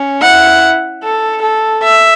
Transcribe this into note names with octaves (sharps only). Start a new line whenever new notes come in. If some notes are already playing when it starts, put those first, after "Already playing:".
Already playing: C#4
E4 F#5
A4
A4
E5